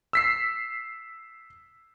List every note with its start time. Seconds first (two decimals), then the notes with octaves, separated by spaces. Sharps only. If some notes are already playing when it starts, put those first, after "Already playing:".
0.13 E6 B6 C7